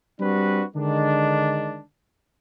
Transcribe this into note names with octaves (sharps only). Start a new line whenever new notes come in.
G3 C4 D4 F#4 B4
D3 D#3 G#3 D4